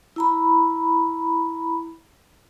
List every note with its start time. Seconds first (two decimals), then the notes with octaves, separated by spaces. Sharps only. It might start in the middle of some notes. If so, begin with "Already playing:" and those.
0.16 E4 A#5 B5